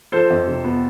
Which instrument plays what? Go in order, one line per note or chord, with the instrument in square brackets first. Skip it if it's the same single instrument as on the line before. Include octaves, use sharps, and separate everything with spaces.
[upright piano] F3 A4 C5
F2
C3
B3